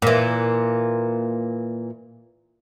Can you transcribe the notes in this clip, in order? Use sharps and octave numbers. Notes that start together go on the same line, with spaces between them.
A#2 E3